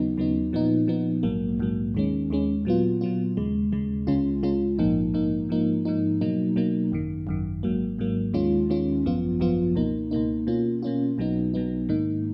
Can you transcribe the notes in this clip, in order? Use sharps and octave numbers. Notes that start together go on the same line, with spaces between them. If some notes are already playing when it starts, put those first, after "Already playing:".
Already playing: D#2 C#3 F#3 B3 D#4
D#2 C#3 F#3 B3 D#4
A#2 F3 B3 D#4
A#2 F3 B3 D#4
A#1 G#2 F#3 A#3
A#1 G#2 F#3 A#3
D#2 D#3 G#3 C#4
D#2 D#3 G#3 C#4
A#2 F#3 B3 F4
A#2 F#3 B3 F4
D#2 C#3 G#3
D#2 C#3 G#3
C#2 C#3 G#3 C#4 F4
C#2 C#3 G#3 C#4 F4
A#1 G#2 F3 A#3 D#4
A#1 G#2 F3 A#3 D#4
G#2 F3 A#3 D#4
G#2 F3 A#3 D#4
B2 F#3 A#3 D#4
B2 F#3 A#3 D#4
G#1 F#2 D#3
G#1 F#2 D#3
G#1 G#2 F#3 A#3
G#1 G#2 F#3 A#3
D#2 D#3 G#3 C#4 F4
D#2 D#3 G#3 C#4 F4
G#1 F#2 F3 B3 F4
G#1 F#2 F3 B3 F4
C#2 B2 A#3 D#4
C#2 B2 A#3 D#4
B2 A#3 C#4 F4
B2 A#3 C#4 F4
B1 B2 F#3 B3 D#4
B1 B2 F#3 B3 D#4
G#2 D#3 A#3 D#4